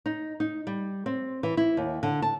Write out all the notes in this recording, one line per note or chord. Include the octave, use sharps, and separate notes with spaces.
D#4
D#4
G3
C4
E3
E4
D#2
D3
A5